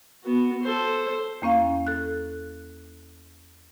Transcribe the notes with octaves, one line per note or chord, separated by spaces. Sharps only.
B3 F#4
A4 C5
E2 A#3 C#4 F5
A4 F#6